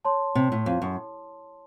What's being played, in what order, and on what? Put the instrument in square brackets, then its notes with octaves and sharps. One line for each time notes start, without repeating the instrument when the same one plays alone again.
[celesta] C#5 A5 C6
[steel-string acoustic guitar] C3
A2
F2
F#2